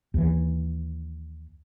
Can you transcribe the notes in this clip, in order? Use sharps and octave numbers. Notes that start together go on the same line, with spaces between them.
D#2 E3